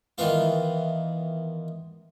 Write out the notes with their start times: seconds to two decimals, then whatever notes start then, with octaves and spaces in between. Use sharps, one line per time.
0.18 D#3 E3 B3 F4